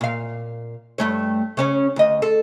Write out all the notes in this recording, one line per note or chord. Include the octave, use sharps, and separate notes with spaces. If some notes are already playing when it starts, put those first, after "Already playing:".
A#2 F5
G2 A3 C#5
C#3 C#4 C#5
D2 D#5
A4